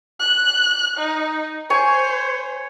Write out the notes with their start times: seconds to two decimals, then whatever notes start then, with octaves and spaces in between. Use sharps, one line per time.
0.19 F#6
0.98 D#4
1.70 C5 C#5 G#5